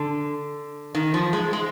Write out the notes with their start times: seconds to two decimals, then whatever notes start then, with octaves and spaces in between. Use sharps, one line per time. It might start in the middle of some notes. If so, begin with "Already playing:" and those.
Already playing: D3
0.95 D#3
1.14 F3
1.33 G#3
1.53 G#3